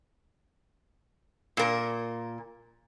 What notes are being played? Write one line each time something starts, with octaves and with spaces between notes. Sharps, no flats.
A#2 A#4